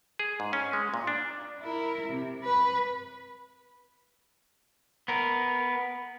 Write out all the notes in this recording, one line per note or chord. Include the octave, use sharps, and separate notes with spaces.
G#4
G#2
C#4
G#3
A#2
D4
E4 A#4
C3
B4
B3 A#4